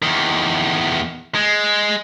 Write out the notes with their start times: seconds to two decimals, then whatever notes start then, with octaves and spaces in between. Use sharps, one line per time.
0.02 E2 D#3
1.35 G#3